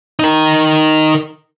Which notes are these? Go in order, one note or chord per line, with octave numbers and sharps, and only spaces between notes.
D#4 A#4